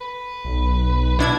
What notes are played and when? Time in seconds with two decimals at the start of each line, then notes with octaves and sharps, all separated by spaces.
0.01 B4
0.45 B1
1.19 B2 D4 E4 G#6